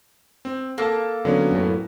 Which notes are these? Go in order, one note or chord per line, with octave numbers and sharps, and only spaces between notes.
C4
A#3 A4 A5
D3 F#3 B3 C#4
F#2 A2